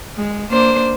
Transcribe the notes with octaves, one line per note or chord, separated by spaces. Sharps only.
G#3
A#3 D4 C5